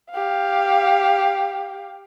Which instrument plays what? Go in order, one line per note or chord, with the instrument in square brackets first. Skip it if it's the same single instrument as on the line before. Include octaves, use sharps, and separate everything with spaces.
[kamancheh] G4 F5